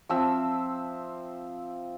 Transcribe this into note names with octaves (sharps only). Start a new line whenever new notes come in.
F3 C4 E5